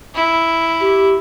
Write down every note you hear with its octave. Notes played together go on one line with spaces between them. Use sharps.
E4
G4